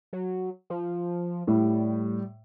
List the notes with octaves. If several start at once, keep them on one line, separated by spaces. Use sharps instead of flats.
F#3
F3
A2 G3